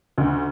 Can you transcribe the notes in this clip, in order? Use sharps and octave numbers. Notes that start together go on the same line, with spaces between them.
D2